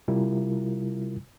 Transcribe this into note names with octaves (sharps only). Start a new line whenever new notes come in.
C3 G3 E4 F4 A#4